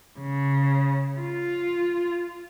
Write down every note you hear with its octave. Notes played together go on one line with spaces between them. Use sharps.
C#3
F4